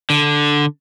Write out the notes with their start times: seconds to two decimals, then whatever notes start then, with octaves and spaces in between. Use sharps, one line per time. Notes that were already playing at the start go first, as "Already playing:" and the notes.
0.10 D3